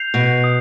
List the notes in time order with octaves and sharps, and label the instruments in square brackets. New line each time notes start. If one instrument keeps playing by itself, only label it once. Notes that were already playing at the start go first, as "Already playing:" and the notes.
Already playing: [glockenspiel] G6 C7 F7
[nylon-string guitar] B2
[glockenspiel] D#6